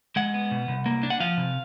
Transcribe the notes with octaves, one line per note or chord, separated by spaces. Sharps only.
G#3 F#5
B3
B2
C2
A#3
D4
F#5
F3 F5
C3